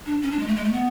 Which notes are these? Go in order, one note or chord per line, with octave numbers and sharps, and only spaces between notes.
D4
C#4
D4
G#3
A3
G#3
A3
B3